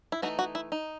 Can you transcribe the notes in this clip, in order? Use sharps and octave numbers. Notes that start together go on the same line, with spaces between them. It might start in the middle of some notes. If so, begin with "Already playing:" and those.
E4
E3 A3 D#4 F#4
F#4
E4
D#4